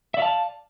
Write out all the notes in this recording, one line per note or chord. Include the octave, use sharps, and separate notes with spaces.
D5 E5 F5 A5